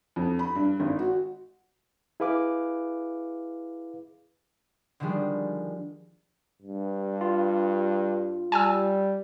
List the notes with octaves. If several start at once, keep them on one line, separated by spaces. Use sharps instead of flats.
F2
B5
G2
G#1
F#4
E4 G#4 B4 F5 D6
D3 D#3 F3 G3 G#3
G2
F4
G3 G#5 A5 E6